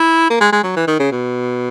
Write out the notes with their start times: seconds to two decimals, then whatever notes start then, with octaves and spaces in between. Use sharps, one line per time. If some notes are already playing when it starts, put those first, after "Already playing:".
Already playing: E4
0.30 A#3
0.40 G#3
0.52 G#3
0.64 F#3
0.76 E3
0.87 D#3
0.99 C#3
1.11 B2